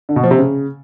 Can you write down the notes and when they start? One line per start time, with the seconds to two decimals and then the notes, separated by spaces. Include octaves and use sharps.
0.09 D3
0.16 B2
0.23 F3
0.31 C3
0.38 C#3